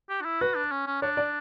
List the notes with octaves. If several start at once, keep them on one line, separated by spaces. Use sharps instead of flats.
G4
D4
E4
F#4 B4
D4
C#4
C#4
D4 C#5
D5